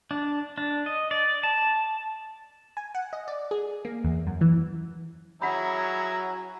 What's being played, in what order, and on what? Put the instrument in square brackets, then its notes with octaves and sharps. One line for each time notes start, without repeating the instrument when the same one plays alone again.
[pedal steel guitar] D4
D4
D#5
D5
A5
[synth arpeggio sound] G#5
F#5
D#5
D5
G#4
A#3
E2
F#2
E3
[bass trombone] F#3 [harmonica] C#4 E4 G#4 [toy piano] F#5 B5 [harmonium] A#5